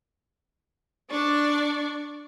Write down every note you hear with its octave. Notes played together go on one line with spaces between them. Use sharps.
D4 D5 C#6